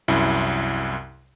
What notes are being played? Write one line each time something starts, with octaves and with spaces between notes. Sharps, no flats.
C2 F#2 E4